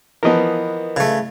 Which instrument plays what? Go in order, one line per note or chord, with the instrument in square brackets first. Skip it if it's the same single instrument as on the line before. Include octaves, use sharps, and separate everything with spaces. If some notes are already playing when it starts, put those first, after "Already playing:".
[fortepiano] E3 F3 B3 [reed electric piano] A#4 D#5
[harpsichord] C#3 A3